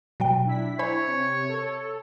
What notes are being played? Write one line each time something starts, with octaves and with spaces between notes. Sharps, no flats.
B2 F#3 G5
D4 E4 B6
C5 C#5 G#5 B5
C3 C#7
A4